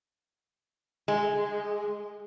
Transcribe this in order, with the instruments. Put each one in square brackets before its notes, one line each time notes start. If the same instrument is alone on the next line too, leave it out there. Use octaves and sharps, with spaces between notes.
[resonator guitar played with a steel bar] G#3